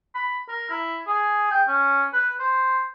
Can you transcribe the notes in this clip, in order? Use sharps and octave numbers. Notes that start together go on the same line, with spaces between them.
B5
A#4
E4
G#4
G5
C#4
B4
C5